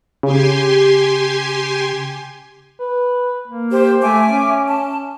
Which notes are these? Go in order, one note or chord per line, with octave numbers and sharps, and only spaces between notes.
C#3 G4 G#5 C6
B4
A#3
G4 C5
A3 E5 G#5 D6
C#4
A5